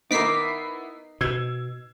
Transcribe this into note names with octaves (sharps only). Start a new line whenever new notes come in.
B3 D#4 E4 A#4 D6 B6 C7
B2 E6 G#6